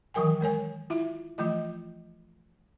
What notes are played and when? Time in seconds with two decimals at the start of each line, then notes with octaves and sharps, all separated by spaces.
0.14 D#3 E3 F#3 A#4 G5 G#5
0.41 G#3 A#4 C#5 G#5
0.90 E4 F4 E5
1.38 E3 F3 A3 F4 D#5